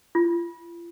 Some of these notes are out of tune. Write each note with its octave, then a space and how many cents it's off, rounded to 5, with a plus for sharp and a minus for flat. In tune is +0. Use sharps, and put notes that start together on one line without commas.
F4 -40